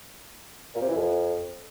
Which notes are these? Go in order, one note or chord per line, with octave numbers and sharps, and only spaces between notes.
A#2
C3
E3
F2